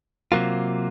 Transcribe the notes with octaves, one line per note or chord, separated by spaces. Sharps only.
C3 F#3 A#3 F4